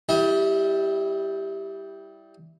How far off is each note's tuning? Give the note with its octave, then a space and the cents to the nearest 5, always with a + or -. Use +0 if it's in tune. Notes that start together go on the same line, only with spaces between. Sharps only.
G3 +0 E4 +0 D#5 +40